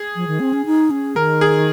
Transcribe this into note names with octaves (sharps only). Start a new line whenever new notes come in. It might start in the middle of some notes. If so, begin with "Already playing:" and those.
Already playing: G#4
F3
D#3
C4
C#4
D#4
C#4
D#3 A#4
G#4